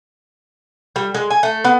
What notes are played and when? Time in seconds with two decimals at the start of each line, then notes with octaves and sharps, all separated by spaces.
0.96 G3
1.14 G#3
1.30 G#5
1.43 A3
1.64 B3